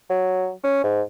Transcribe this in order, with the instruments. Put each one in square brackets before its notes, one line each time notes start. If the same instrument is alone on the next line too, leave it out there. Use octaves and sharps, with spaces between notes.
[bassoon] F#3
C#4
G#2